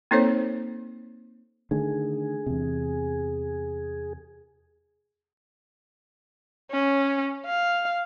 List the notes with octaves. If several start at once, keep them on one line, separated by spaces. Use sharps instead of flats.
A#3 C4 D#4 A4 C5 C#5
D3 D#3 A3 G#4
E2 C3
C#4
F5